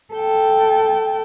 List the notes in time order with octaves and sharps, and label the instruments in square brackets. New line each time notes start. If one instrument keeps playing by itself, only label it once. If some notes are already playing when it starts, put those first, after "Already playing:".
[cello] A4 G5